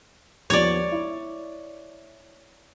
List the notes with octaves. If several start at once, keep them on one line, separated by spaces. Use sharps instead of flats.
D#2 F3 B3 C#5 D5
E4